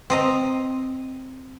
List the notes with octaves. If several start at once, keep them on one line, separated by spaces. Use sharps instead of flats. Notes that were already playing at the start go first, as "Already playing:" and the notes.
C4 D#5 A#5